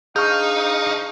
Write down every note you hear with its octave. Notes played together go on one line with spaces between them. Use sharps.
D4 D#4 G#4 C5 F5 C#6 F6 G6